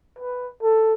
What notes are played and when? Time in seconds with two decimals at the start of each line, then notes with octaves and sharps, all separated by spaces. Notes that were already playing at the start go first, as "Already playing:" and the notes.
0.19 B4
0.63 A4